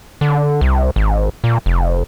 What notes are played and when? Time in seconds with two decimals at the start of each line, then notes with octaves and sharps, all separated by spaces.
0.21 D3
0.61 C2
0.96 G#1
1.44 A#2
1.66 F1